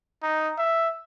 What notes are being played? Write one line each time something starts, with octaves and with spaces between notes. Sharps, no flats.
D#4
E5